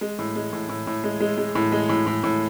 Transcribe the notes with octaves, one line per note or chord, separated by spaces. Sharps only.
G#3
A2
G#3
A2
A2
A2
G#3
G#3
G#3
A2
G#3
A2
A2
A2